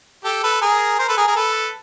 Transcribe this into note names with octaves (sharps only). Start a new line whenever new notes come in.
G4 A4
A4 B4
G#4 A#4
A#4 C5
A4 B4
G#4 A#4
G#4 A#4
A4 B4